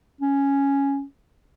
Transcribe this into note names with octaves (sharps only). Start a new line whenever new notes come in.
C#4